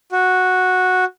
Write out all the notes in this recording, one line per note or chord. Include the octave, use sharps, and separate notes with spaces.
F#4